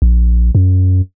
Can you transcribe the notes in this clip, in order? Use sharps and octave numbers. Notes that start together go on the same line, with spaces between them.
A#1
F#2